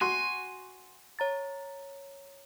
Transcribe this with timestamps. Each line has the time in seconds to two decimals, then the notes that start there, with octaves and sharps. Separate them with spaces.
0.01 F#4 G#5 C6
1.19 C#5 A#5 A6